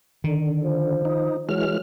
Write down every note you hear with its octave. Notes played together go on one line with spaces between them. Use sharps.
D3 D#3
F3
D#4
E3 F#3 G#3 F6